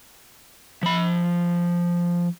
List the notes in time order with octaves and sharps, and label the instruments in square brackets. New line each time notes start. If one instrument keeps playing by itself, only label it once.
[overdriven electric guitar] F3 B5